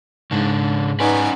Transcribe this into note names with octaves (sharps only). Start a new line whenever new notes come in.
G#2 C#3 D4
B3 C#4 D#4 B4 D5 G#5